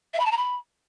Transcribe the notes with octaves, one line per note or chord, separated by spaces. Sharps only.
E5
B5
A5
A#5
B5